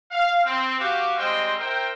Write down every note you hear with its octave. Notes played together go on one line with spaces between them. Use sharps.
F5
C4
F#4 G4 F5
G3 G#3 C4 C5 D#5 G5
E4 A#4 C5 G5